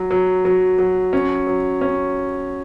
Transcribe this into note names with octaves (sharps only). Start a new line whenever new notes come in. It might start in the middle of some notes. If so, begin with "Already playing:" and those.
Already playing: F#3
F#3
F#3
F#3
C#4
F#3
C#4